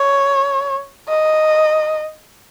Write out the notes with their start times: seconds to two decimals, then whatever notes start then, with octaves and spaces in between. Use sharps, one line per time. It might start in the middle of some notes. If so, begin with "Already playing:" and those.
Already playing: C#5
1.09 D#5